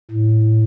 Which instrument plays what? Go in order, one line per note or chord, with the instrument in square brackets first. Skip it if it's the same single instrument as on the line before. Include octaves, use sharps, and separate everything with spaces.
[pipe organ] A2